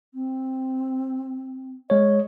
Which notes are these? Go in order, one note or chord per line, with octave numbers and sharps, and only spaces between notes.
C4
G#3 C#5 D#5